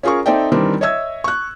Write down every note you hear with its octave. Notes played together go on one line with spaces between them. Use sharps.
C#4 F4 G#4 A#4 C#6
C4 D#4 A4 D5 E5 G5
D#3 E3 G3 C4 D4 A#4
C#5 D#5 E5 E6 G#6
C#6 F#6